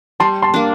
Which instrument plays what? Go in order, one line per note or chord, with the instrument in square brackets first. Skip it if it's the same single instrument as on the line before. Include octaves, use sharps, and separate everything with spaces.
[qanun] G3 [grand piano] A5 C6
[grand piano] A5 C6
[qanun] A#3 D4